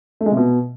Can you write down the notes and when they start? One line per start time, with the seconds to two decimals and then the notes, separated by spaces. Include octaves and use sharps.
0.21 A3
0.26 G#3
0.32 C3
0.37 B2